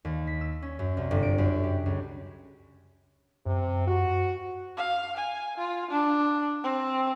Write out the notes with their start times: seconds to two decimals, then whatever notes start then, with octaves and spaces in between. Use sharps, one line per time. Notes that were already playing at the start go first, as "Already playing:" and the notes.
0.05 D#2
0.27 B6
0.41 E6
0.62 C#4
0.79 F#2
0.97 C2
1.11 G1
1.23 D7
1.38 F#2
1.63 G4
1.86 C#2
3.46 F#2 C3
3.87 F#4
4.77 F5
5.17 G#5
5.57 F4
5.91 D4
6.63 C4